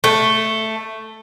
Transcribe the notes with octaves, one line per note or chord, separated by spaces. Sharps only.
A3